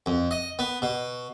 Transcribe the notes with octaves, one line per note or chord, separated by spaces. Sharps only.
F2
D#5
B3
B2